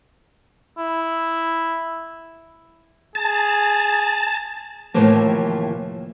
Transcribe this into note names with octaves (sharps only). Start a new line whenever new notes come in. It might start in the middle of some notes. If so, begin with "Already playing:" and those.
E4
G#4 A5
D#2 A2 C3 E3 F3 A#3